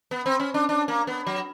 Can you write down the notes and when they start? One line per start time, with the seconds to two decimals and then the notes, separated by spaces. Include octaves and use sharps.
0.11 B3
0.26 C4
0.40 C#4
0.54 D4
0.69 D4
0.88 A#3
1.07 B3
1.27 F#3